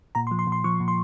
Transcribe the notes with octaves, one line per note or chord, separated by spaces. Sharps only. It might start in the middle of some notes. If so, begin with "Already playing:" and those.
A#2 A#5
C6
F3
C6
A#2
C6
F3 C#6
A#2
C6